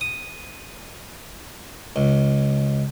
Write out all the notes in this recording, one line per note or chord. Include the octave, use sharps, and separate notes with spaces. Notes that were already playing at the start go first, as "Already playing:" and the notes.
D#6
C#2